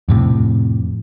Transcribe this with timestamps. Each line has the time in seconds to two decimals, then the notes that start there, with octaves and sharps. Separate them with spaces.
0.09 F2 A2 C3